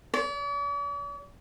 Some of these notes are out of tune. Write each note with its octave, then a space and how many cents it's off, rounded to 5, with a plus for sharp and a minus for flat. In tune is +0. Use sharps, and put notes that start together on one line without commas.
D5 -45